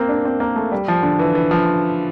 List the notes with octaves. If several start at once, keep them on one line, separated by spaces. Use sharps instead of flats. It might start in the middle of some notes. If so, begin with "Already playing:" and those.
Already playing: A#3 C4
D4
C4
A#3
A3
G3
F3
D3
E3
E3
F3